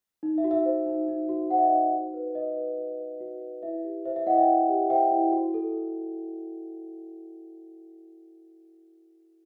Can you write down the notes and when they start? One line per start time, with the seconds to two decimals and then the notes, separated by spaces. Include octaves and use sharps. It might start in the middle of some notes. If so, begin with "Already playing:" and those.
0.23 D#4
0.38 E5
0.44 F#4
0.51 E5
0.65 C5
0.86 D#4
1.08 D#4
1.29 F#4
1.50 C5 F#5
1.58 E5
1.65 D#5
1.72 D#4 E5
1.93 F#4
2.14 B4
2.35 F#4 D#5
2.57 B4
2.79 F#4
3.00 B4
3.20 F#4
3.41 B4
3.63 E4 E5
3.84 G4
4.05 C5 E5
4.16 E5
4.27 E4 D#5 F#5
4.37 E5 G5
4.47 E4
4.69 G4
4.90 C5 E5 G5
5.11 E4
5.32 F#4
5.54 A4